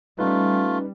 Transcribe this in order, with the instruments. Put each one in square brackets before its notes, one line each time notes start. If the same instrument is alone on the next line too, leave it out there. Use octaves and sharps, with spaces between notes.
[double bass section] G3 [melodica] A3 F4 [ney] C#4 [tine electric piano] D#4 B4